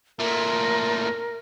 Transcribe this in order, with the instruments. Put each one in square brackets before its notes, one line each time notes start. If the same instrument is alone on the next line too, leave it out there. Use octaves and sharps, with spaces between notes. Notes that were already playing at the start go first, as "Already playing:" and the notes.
[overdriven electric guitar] A#2 A3 [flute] A#4